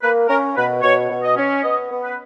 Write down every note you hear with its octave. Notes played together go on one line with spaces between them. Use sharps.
A#3 B4
C#4 A#4
B2 B4
B2 C#5
B2
D#5
C#4
B3 D#5
B3
B4